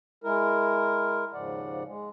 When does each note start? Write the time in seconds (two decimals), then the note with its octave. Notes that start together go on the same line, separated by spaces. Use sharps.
0.24 G#3 E4 A#4
1.34 D#2 G#2 C#3 F3 D5 F#5
1.87 G#3